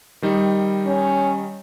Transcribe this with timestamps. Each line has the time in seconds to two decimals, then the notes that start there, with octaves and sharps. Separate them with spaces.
0.22 D#3 G3 D#4
0.86 C#4